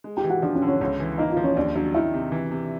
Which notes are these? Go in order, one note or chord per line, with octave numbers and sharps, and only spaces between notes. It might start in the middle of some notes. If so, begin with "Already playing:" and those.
G#3
G4 G5
E3
F#4 F#5
F3 D4 D5
C#4 C#5
D3
C#4 C#5
C#2 C#4 C#5
E3
A#3 D#4 D#5
F4 F5
F3
C#4 C#5
D#2 D4 D5
F#3 D4 D5
D#3 E4 E5
C3
E3
C3